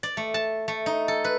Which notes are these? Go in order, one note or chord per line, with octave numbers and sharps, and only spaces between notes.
D5
A3
A5
A3
D#4
A4
B4